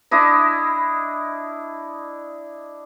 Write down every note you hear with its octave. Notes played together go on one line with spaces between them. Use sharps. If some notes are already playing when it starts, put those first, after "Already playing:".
D4 E4 D#5